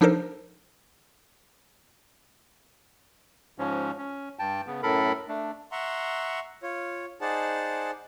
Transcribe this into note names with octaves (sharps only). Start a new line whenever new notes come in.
F3 D4 D#4 A4 A#4 C5
G#2 F3 C#4
C#4
G2 G5 A5
C#3 B3
F#2 A2 A4 A#4 B5
A3 D4
E5 F#5 A#5 C6 C#6
F4 C#5
D#4 G#4 C5 D5 F#5 A5